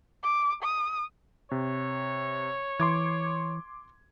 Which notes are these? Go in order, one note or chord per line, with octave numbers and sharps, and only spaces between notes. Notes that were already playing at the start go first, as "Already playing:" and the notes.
D6
D#6
C3 C#5
E3 C6 D6 G#6